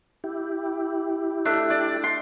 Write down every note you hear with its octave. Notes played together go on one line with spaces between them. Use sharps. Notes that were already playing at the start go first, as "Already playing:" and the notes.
E4 G4
A3 D4 E5
D5
C6